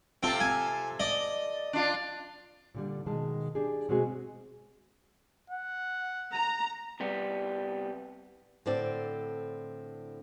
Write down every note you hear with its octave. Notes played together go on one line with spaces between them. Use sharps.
C3 C4 F4 A4
G#5
D5 D#5
D4 F4
A#2 D3 G3
B2 D#3 G#3 A5
D4 G4 G#4
B2 G#3 C4 F#4 G#4
F#5
A#5
C3 G3 B3
A2 D3 C4 D5